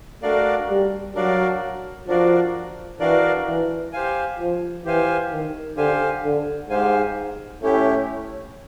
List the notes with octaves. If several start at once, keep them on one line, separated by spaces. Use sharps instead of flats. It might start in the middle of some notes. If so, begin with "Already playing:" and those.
A3 D4 F#4 A#4 D5 F5
G3
F#3 D4 F#4 A#4 D5 F5
F3 D4 F#4 A#4 D5 F5
E3 D4 F#4 A#4 D5 F5
E3
G4 C5 F5 G#5
F3
E3 G4 C5 F5 G#5
D#3
D3 G4 C5 F5 G#5
D3
G#2 G4 C5 F5 G#5
A2 A3 C#4 E4 G4